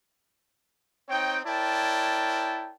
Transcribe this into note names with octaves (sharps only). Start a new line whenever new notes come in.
C4 D#4 C#5 G5
E4 A#4 C#5 D5 G5 A5